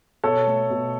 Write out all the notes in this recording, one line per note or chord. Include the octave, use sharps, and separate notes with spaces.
B2 A4 C#5
A3
B2